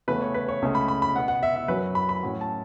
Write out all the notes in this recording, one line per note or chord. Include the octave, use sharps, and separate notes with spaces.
E2 C#3 A3 C#4 B4
C#5
B4
C#5
C#2 C#3 A3
B5
B5
B5
B2 B3 F#5
F#5
E5
E5
F#2 F#3 C#4 B4
B5
B5
A2 F#3 C#4
A5